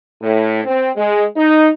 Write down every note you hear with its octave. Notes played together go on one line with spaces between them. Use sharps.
A2
C4
G#3
D#4